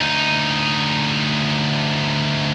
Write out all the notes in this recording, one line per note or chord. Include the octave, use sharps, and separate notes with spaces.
D2 D#4